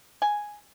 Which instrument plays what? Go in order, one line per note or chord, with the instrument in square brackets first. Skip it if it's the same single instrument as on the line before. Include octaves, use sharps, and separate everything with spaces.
[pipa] G#5